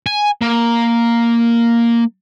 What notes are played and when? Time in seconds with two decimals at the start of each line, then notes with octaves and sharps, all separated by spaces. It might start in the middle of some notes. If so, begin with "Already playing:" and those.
0.06 G#5
0.41 A#3